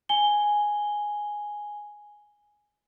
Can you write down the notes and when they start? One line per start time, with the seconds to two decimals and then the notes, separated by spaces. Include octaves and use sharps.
0.09 G#5 G7